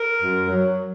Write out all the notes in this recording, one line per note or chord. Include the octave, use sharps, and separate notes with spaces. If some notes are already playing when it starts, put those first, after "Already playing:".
Already playing: A#4
F#2
F#3